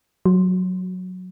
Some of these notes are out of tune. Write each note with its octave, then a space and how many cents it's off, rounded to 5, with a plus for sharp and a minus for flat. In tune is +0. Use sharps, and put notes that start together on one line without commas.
F#3 -10